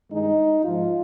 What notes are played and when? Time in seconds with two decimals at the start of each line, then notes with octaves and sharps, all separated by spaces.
0.11 G2 D#3 G#3 D#4
0.65 G#2 F3 G#3 F4